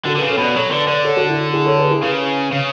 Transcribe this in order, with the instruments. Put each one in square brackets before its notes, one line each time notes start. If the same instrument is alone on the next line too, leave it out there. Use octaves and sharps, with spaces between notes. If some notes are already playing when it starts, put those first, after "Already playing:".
[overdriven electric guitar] D3 [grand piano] F#4 A4
[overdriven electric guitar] D3 [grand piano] G#4 B4
[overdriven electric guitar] C#3
[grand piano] A4 C#5
[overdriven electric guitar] B2 [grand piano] B4 D5
[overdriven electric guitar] F#3 [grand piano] A4 C#5
[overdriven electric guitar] D3 [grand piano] B4 D5
[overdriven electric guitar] D3 [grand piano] B4 D5
[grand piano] A4 C#5
F#4 A4
E4
E4 G#4
A4 C#5
G#4 B4
E4 G#4
[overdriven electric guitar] C#3 [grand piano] G#4 B4
[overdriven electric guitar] C#3